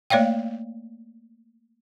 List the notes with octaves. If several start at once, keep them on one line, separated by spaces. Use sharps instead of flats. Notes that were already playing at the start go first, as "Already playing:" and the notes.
A3 A#3 C#5 D5 F5 G5